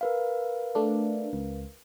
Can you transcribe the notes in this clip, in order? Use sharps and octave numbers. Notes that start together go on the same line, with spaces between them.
A#4 B4 F5
A3 D4
C#2